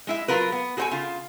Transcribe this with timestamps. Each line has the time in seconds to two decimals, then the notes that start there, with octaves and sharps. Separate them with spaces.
0.07 G#3 E4 E5
0.28 F#3 F4 A#4 B4
0.52 B3
0.77 F#4 G#4 A4 C5 G5 G#5
0.91 C#3 F4